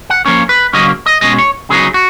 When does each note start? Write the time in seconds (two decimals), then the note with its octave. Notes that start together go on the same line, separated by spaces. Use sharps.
0.10 F#5
0.25 F3 A#3 C#4 C#5
0.49 B4
0.73 C#3 F#3 A#3 C#4 D#5
1.06 D#5
1.21 B2 G#3 C#4 D#5
1.38 C#5
1.70 C#3 F#3 B3 D#4 G#4
1.94 F#4